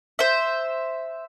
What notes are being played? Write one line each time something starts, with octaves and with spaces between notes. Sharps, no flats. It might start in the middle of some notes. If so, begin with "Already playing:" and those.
C5 E5